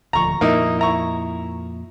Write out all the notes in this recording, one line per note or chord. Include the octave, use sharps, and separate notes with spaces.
D#1 D2 F3 A#5 C#6
F2 A#2 F3 A#3 D#4 E4
E4 A#5 C#6